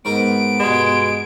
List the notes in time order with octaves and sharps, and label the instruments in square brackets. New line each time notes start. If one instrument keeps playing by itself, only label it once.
[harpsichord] G#2 C4 A#4 [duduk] B3 [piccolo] D7
[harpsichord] G2 B2 [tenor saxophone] G#3